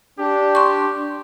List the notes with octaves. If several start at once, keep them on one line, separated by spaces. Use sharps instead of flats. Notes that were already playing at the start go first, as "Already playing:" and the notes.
D4 G4
C6 C#6